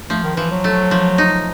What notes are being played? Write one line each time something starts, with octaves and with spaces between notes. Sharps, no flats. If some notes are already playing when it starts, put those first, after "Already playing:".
F3 A3
D#3
E3 F3
F#3
A3
F3
D#4